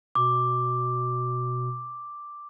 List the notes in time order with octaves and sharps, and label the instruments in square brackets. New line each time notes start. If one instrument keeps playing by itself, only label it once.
[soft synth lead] B2 [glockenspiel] D6